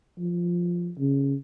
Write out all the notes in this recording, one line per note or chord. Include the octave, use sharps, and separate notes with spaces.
F3
C#3